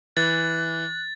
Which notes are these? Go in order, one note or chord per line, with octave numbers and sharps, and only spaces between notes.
E3 F#6 A6